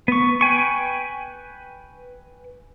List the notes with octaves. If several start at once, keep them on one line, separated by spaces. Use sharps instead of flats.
B3 C#6
B4 G5 G#5 C#6